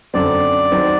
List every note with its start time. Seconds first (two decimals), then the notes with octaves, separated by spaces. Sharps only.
0.14 F#2 D3 F#3 C4 D5
0.72 D#3 F#3 C4